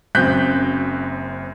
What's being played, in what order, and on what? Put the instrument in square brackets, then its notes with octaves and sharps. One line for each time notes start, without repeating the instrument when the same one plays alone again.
[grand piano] F#1 F#2 C4 F#6 G6 B6